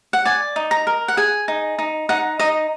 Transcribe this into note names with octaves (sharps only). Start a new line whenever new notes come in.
F#5
D5 G#5
D#4
A#5
A#4
F#5
G#4 G#5
D#4
D#4
D#4 F#5
D#4 D#5